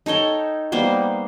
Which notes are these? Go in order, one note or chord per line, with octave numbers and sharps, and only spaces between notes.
D#4 A4 C#5 G5
G3 A#3 B3 C5